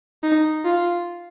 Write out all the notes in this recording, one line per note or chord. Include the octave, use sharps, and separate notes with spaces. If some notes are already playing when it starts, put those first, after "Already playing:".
D#4
F4